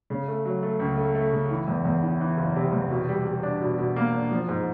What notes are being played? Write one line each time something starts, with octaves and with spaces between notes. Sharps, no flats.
C#3
A3
F#3
A3
C#2
A3
A3
C#3
E3
E2
E2
E3
E3
F#1
C3
E2
B2
G3
G3
D4
B2
B2
A#3
D4
F3
G#2